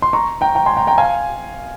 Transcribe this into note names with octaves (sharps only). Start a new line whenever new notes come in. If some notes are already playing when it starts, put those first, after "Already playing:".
C6
A#5 C#6
G5 A#5
G5 A#5
G#5 C6
G5 A#5
G5 A#5
F5 G#5